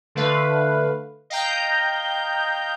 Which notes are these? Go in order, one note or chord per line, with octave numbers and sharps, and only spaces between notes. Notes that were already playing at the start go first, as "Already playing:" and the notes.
D3 A3 B4 F5
D#5 F5 G5 A#5 G6